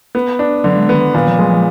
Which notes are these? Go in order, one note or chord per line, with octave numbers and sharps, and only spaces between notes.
B3
D4
D3 F#3
G#3
D#3 B3
A#2 D#3
F3
F#3 G#3
F3